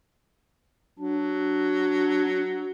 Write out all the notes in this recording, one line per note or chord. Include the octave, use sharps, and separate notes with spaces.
F#3 D4